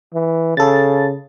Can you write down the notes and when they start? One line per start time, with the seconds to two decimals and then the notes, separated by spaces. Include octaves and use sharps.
0.14 E3
0.57 C#3 A4 A6